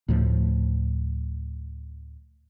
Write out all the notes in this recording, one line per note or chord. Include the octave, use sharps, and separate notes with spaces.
D2 A2 F3